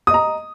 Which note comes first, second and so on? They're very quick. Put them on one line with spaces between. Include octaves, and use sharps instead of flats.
D#6 D#5 A#5